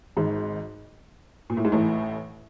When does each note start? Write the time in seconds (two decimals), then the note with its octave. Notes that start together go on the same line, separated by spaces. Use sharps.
0.17 G#1 G#2
1.50 A#2
1.57 A2
1.65 G#2
1.72 A1 A2